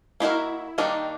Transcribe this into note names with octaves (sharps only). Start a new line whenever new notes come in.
A#3 D#4 E4 F#4 A#4
D#3 G3 A#3 D4 D#4